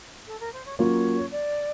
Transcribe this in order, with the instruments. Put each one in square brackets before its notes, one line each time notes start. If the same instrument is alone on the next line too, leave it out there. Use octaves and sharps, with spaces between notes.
[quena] A4
A#4
C5
C#5
[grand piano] F#3 A#3 C#4 F4 [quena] C#5
[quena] D5